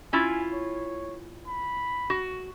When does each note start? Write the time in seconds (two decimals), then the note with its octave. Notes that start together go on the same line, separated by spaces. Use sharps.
0.13 C#4 E4 F4 G#5
0.53 C#5
1.47 B5
2.10 F#4